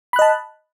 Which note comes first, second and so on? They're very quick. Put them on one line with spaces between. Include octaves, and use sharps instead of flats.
B5 F#6 D#5 A5